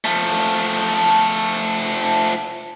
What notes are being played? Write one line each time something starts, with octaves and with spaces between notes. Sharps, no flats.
F3 A3